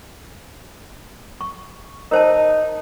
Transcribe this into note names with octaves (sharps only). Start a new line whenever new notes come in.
C#6
D#4 A#4 C5 A5